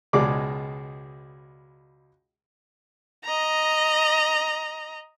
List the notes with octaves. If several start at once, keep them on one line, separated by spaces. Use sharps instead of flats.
C#2 B2 G#3 G#4 D5 D6
D#5 A#5